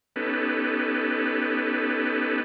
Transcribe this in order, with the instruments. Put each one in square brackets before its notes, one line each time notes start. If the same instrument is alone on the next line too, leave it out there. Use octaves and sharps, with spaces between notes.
[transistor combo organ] B3 C#4 D#4 G4 A4 B4